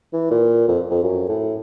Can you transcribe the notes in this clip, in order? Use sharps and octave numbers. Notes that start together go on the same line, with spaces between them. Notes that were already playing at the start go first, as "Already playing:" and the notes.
E3
A#2
F2
F2
F#2
A2